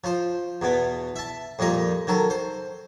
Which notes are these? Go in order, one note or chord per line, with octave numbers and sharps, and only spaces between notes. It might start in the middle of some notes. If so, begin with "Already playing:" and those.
F3 C5
E2 B2 B3
E5 A5
F2 A#2 G3 D#5 A#5
D#3 F#3 A4
C5